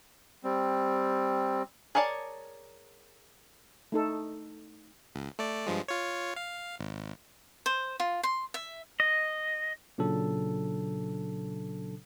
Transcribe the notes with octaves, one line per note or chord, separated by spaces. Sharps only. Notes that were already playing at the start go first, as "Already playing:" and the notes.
G3 C4
G#4 A#4 C#5 D5 A5
A3 D#4 A4
C#2
A3 D5
G2 F3 G#3
F4 C#5
F5
G#1
C5
F4
C6
E5
D#5
A#2 C#3 F#3 D4 A4